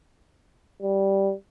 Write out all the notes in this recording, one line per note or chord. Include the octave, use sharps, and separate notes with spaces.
G3